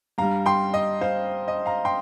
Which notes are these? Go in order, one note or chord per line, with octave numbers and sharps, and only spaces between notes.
G2 G3 F5 A#5
G5 C6
D#5
C5 F5
D#5
F5 A#5
G5 C6